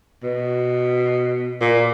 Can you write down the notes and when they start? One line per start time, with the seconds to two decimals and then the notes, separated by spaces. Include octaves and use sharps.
0.23 B2
1.61 A#2